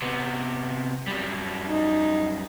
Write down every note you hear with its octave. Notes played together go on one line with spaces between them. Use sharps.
C3 B3
F#2 G3
D#4